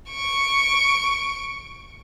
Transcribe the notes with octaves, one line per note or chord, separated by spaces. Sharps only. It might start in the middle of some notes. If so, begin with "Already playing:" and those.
C#6 D7